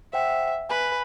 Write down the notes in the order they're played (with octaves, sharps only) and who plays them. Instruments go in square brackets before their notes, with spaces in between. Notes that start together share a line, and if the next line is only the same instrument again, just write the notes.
[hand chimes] C5 F#5 G5 [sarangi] E5
[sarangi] B4 [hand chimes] G#5 B5